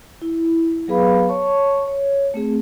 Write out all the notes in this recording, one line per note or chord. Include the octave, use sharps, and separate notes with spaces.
E4
F#3 B3 G#4 B4 F5 B5
C#5 A5 C#6
C#5
A3 C4 G#4